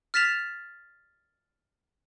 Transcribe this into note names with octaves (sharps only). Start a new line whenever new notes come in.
F6 A6 B6 E7 F7